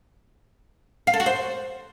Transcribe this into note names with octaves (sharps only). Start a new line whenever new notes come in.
F5
A4
F#4
C5